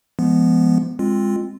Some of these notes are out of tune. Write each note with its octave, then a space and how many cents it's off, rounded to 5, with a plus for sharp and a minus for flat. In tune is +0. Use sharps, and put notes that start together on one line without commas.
F3 -30 G#3 +0 B3 -5
G#3 -20 C4 +15 F4 +0